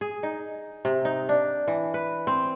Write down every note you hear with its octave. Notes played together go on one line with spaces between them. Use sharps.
G#4
D#4
C3
D#4
D4
E3
B4
C4